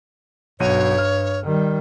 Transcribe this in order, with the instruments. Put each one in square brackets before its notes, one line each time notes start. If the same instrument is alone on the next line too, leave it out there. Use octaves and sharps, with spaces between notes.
[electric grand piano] B1 F#4 D#7 [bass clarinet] G2 [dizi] C#5
[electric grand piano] F6
[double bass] D#3 G3